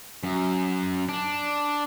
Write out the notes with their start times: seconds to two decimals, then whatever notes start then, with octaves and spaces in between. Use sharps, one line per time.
0.23 F#2
1.09 D4